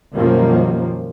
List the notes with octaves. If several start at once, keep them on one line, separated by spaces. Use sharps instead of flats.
F#2 B2 D#3 F3 G3 A#3